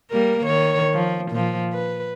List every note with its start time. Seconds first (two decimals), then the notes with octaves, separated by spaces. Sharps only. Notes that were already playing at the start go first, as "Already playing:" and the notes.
0.11 G3 A#3 A#4
0.45 D#3 C#5
0.93 F3
1.32 A#2 F3
1.74 B4